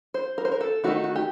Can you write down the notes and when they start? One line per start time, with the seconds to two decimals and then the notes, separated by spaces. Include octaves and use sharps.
0.14 C5
0.38 A#4
0.45 C5
0.52 A#4
0.61 A4
0.84 D#3 A3 D#4 F#4
1.04 F#4
1.16 G4